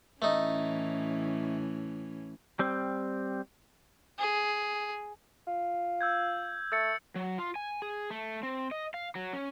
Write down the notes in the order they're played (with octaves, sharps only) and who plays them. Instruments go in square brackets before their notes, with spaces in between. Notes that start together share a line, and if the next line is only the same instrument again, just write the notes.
[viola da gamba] A2 E3 C#4 [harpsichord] A3 D#4
[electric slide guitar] G3 C4
[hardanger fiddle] G#4
[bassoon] F4
[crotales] E6 G6 G#6
[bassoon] A3 [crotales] E6 A6 C#7
[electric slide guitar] F#3
F4
G#5
G#4
A3
C4
D#5
F5
F#3
C#4